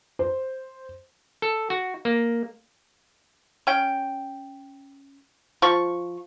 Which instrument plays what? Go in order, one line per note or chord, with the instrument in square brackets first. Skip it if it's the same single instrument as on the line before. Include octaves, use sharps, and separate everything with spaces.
[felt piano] C5
[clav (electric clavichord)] A4
F#4
A#3
[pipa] C#4 G5
F3 C#6